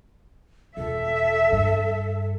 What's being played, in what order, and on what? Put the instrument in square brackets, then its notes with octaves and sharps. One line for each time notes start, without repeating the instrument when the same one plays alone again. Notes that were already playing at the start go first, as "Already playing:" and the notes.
[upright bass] E1 F4 [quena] A4 [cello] E5
[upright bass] G2